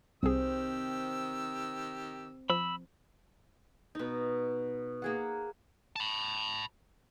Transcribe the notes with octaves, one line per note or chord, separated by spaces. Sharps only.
C2 D#3 C4 G4 G#4 E6
F3 B5 E6
B2 D#4
A#3 G#4 F#5
A5 B5